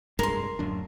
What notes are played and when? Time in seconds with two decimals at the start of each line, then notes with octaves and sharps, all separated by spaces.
0.19 F1 G2 G#3 A#4 C6
0.59 D1 F#2 D4